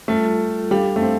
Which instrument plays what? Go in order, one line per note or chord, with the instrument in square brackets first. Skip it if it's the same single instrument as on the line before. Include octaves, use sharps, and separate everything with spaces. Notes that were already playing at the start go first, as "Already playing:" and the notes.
[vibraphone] G3 F4 A4 [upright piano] A3
[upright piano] G3 [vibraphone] D4 A4 F5
[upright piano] A3
C4